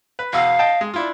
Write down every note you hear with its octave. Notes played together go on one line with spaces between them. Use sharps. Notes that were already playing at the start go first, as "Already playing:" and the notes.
B4
E2 B2 F5 E6
D#5 G5 A5
G#3
D4 E4 F4